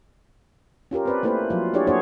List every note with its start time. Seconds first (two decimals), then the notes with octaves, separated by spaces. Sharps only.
0.91 C#4 F4 G4 A#4
1.05 C4 B4 D5
1.23 A3 A#3 E4 B4 C5
1.50 F3 F#3 F4
1.74 D4 E4 G4 G#4 C#5 D5
1.87 A#3 D4 F#4 G#4 C5 C#5